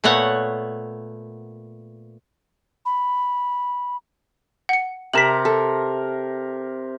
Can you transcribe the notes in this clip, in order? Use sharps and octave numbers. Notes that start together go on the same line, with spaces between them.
A#2 A3 B3 C#5 F#5
B5
F#5 C#7
C3 A#4 B6 E7 F#7
A4